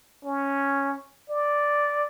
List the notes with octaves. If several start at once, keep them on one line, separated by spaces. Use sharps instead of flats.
C#4
D5